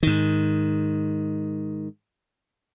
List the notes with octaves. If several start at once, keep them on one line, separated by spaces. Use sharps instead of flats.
G#2 D#3